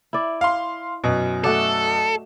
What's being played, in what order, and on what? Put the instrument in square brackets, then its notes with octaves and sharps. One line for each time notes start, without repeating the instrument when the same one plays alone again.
[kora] E4 D5
[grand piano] F5 C6
F#2 B2
[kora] A3 F#4 D5 [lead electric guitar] A4